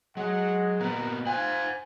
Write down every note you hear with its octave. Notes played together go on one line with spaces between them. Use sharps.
F#3 G#3 F#5
A#2 B3 A#4
F4 C5 F#5 G#5